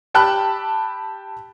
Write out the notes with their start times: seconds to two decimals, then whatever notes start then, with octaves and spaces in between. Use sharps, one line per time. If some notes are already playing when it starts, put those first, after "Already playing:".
0.14 G4 G5 A5 B5 E6 F#6